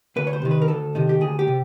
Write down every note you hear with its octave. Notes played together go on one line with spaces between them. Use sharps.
D2 B4
C#5
C5
C3 D#3
B4
A#4
D2 A4
C3 D#3
G4
D2 G#4
G4
C3